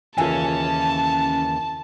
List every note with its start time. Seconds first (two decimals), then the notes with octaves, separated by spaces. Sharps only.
0.18 D#2 C#3 E3 C#4 F4 A4 G#5 A5